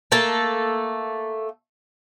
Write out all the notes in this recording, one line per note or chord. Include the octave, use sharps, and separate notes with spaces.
A3 A#3 A4